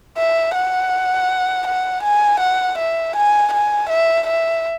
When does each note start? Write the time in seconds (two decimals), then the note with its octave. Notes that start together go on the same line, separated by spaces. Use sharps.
0.17 E5
0.55 F#5
1.67 F#5
2.03 G#5
2.40 F#5
2.78 E5
3.16 G#5
3.53 G#5
3.89 E5
4.27 E5